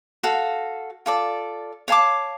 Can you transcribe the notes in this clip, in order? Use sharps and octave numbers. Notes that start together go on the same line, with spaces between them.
F#4 A4 F5
F4 A4 D5
C#5 F5 A5 D6